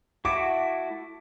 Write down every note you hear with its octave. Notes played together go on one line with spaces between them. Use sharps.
A3 E4 F#4 D6